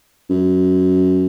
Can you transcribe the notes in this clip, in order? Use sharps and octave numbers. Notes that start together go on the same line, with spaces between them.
F#2